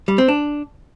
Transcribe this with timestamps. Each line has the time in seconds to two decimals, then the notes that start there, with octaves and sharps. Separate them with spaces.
0.08 G3
0.18 C4
0.28 D4